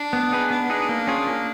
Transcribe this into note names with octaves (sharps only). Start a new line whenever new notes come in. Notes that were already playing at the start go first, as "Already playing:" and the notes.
Already playing: D4
B3
D#4 G#4 B4
B3 D4
D#4 G#4 B4
A#3
C#4 F4 G#4
A#3